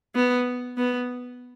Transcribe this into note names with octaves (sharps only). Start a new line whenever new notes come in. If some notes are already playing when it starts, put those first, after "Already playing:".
B3
B3